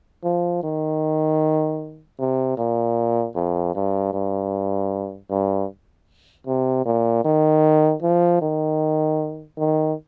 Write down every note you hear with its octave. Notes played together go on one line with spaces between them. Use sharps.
F3
D#3
C3
A#2
F2
G2
G2
G2
C3
A#2
D#3
F3
D#3
D#3